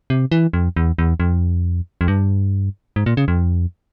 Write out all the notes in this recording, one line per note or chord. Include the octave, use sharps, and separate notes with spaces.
C3
E3
F2
E2
E2
F2
F2
G2
G#2
A#2
C#3
F2